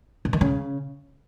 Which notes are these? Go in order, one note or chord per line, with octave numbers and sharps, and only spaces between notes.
C3
D#3
C#3